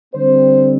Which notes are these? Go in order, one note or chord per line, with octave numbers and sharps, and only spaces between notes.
D3 G3 C4 C5